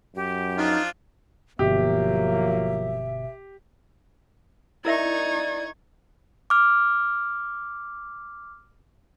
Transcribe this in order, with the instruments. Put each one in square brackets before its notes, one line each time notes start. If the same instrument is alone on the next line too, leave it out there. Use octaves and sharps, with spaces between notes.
[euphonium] F#2 [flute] G4
[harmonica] F3 D4 F4 [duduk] D#4
[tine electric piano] G1 B2 [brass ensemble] F3 F#3 A#3 [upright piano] G4 [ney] E5
[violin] D#4 C#6 [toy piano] E4 A#4 E5 [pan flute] D5 [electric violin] G#6
[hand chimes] D6 F6